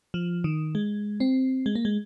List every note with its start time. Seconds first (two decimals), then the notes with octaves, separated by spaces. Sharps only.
0.14 F3
0.44 D#3
0.75 G#3
1.20 C4
1.66 G#3
1.75 A#3
1.85 G#3